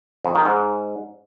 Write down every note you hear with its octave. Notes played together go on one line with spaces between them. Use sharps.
F2
D#3
G#2